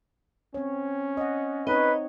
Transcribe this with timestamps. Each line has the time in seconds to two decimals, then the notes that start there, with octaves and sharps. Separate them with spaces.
0.54 C4 C#4 C#5
1.17 D#5 F#5
1.67 C4 D#4 B4 C#5 D#5